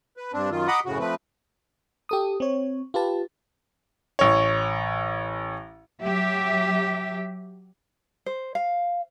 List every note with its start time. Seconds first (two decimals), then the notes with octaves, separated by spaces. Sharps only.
0.17 B4
0.33 G2 C4 D4
0.51 F#2 D#3 F4
0.68 D#5 F#5 A#5 B5 D6 D#6
0.86 F#2 A2 C#3 F#4
0.99 F3 A3 C4 B4
2.09 G4 A4 D#6
2.40 C4 C#5
2.94 F4 G4 B4 A5
4.19 A1 C#5
6.04 F#3 G4 E5
8.26 C5
8.55 F5